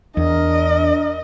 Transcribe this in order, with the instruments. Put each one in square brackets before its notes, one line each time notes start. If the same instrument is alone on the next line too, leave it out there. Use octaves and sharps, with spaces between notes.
[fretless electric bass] E2 [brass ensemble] D4 A#4 [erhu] D#5